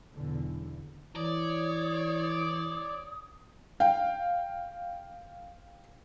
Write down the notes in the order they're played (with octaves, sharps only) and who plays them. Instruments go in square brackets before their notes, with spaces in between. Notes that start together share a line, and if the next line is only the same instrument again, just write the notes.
[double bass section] B1 E2 A#2 D3
[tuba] E3 [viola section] C#5 [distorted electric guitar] D5 [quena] D#6
[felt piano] F5 G5